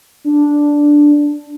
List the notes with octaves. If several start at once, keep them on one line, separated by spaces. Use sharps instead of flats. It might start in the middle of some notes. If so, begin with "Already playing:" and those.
D4